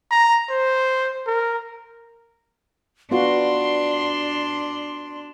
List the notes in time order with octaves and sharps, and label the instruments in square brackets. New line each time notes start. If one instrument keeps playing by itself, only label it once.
[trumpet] A#5
C5
A#4
[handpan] B3 F4 F#4 [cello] D4 [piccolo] C6